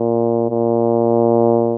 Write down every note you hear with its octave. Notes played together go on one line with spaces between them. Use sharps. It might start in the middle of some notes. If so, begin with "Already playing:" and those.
Already playing: A#2
A#2